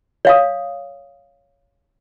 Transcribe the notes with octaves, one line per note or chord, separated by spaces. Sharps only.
C#5 F5 D#6